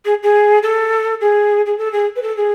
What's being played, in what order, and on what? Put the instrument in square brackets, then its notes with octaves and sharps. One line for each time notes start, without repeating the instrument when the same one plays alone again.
[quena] G#4
G#4
A4
G#4
G#4
A4
G#4
B4
A4
G#4